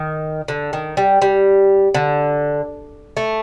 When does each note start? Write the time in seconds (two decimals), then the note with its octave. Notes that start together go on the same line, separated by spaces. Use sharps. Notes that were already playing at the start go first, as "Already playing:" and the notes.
Already playing: D#3
0.48 D3
0.73 D#3
0.97 G3
1.22 G3
1.94 D3
3.17 A3